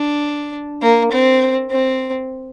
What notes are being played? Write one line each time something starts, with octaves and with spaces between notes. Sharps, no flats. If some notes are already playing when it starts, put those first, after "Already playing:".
Already playing: D4
A#3
C4
C4